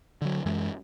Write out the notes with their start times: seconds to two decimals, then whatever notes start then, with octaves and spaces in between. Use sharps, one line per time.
0.22 D3 F#3
0.46 F#2 E3 G#3